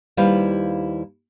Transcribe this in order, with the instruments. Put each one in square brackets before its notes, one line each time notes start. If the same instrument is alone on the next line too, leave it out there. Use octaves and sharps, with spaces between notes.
[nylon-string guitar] D#2 G3 E4 B4 C5 F5